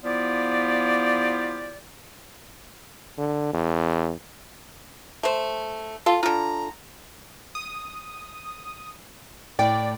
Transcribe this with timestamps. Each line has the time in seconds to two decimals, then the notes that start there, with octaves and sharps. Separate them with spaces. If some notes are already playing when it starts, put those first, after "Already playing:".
0.03 F3 B3 E4 F4 G4 D5
3.18 D3
3.53 E2
5.23 A3 C5
6.06 F4 A4
6.23 D3 F4 A#5
7.55 D#6
9.59 A2 D5 G5